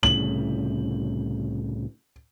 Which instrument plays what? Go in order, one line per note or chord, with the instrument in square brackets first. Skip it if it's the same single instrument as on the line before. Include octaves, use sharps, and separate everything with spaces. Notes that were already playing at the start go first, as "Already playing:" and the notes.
[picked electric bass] C2 A2 C#3 [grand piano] F#7